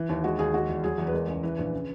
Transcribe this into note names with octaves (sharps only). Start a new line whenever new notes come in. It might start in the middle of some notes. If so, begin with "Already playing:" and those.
Already playing: E3
D#2
G#3 F#4
D#2 G#4
G#3 F#4
E2
F#3 G#4
E2
B4
G#3 A#4
C#2
E3 B4
A#1
C#3